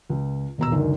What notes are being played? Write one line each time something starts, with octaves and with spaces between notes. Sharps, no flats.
C#2
D#1 B2 A#5 E6
C#2 F#2 D3 D#3